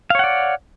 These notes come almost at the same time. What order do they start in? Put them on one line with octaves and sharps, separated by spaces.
F5 C#5 F#5 D5